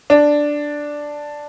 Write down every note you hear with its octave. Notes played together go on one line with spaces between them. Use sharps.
D4